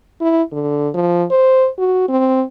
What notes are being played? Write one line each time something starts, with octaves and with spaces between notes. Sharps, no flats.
E4
D3
F3
C5
F#4
C4